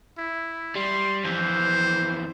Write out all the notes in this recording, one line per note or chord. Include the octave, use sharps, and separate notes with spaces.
E4
G3 C6
F2 E3 C5